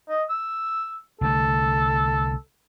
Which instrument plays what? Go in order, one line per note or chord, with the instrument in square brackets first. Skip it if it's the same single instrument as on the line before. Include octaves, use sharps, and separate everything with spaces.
[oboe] D#5
E6
[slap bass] C2 D3 A3 [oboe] A4